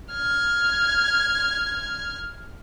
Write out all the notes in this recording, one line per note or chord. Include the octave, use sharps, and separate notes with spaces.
F6 G#6